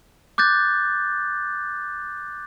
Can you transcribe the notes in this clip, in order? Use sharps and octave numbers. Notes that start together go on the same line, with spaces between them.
D6 F#6 G6 A6